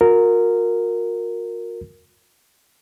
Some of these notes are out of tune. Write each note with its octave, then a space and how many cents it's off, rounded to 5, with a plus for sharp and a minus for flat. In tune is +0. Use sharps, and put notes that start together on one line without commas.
F#4 -45 A#4 -10